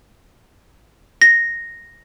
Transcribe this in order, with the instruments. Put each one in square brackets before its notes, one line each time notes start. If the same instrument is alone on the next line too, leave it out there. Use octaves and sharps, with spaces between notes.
[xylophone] A#6